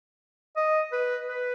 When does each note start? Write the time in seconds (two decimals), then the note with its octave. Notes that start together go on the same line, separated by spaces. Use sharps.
0.56 D#5
0.92 B4
1.29 B4